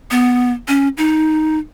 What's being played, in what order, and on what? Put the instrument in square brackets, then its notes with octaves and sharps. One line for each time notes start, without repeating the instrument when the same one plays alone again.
[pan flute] B3
C#4
D#4